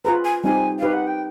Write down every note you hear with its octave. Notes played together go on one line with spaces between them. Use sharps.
F4 G#4 B4 A#5
G#5
G3 C4 D#4 G4 G#5
D#4 G4 B4 F5
F#5
G5